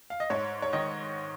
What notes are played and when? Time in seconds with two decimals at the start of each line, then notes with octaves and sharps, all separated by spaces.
0.10 F5
0.20 D#5
0.30 G#2 C#5
0.62 C#5
0.73 D#3 D#5